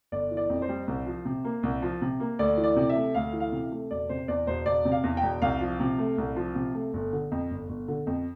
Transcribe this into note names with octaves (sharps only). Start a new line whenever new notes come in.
G1 D5
E3
D5
F2
C5
G3
C2
F3
C3
A#3
C2
F3
C3
A#3
D2 D5
E3
D5
C3
E5
A3
D2 F5
E3
F5
C3
A3
E1 D5
C3 C5
E2 D5
E1 C5
E1 D5
C3
F5
E2
G5
E1
C2 F5
F3
C3
A3
C2
F3
C3
A3
G1
D3
F2
G1
G1
D3
F2